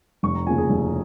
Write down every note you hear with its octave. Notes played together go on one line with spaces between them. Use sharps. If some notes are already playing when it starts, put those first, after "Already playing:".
F1 C#6
A#5
D#2 C#3 F3 G#5
G#4
F1